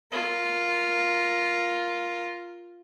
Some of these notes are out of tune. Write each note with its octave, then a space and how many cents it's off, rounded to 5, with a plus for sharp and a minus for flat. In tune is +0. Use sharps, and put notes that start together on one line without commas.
F4 +0 A#4 +10